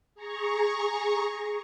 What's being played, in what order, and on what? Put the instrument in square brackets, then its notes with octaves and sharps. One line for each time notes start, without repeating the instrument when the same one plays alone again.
[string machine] G#4 A#5 C#6